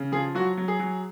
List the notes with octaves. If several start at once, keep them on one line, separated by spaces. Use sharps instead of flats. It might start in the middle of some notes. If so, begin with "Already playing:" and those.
Already playing: C#3
F3 G#4
F#3 F#4
F#3
G#4
F#3